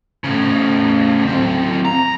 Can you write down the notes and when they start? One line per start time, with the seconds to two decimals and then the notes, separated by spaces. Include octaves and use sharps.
0.24 A2 C#3
1.25 F#3 C4
1.85 A#5